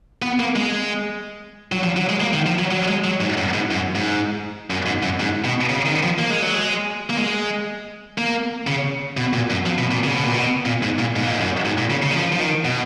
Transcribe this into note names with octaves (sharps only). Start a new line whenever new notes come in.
B3
A#3
G#3
F#3
F3
F#3
G#3
A#3
D#3
F3
F#3
F#3
G#3
F#3
G#2
F#2
G#2
F#2
G#2
F#2
G#2
F#2
G#2
B2
C#3
D#3
F3
A#3
G#3
F#3
G#3
A#3
G#3
A#3
C#3
B2
A#2
F#2
F3
B2
A#2
C#3
B2
A#2
B2
A#2
G#2
A#2
G#2
A#2
G#2
F#2
G#2
A#2
C#3
C#3
D#3
F3
F3
D#3
B2